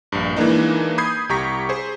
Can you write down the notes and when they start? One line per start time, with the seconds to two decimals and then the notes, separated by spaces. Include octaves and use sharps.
0.12 A#1 G2
0.36 E3 G#3 A#3 D4 D#4
0.98 B5 D#6 G6 G#6 C7
1.29 C2 G4 A#5 C#6 B6
1.69 G#4 C5